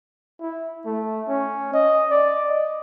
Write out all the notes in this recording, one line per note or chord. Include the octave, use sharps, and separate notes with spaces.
E4
A3
C#4
D#5
D5
D#5